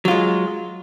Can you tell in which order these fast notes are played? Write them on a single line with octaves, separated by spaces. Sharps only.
F#3 F4 G#3